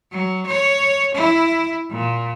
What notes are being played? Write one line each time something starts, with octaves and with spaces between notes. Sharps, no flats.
F#3
C#5
E4
A#2